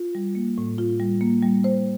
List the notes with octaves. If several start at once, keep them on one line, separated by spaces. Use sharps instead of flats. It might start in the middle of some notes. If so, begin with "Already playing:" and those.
Already playing: F4
G3
A#3
A2
F4
G3
A#3
G3
C5